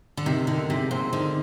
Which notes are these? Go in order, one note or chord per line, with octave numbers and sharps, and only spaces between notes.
D3
C3 D#3
D3 D#3
C3 G#3
A#2 C4
D3 D#3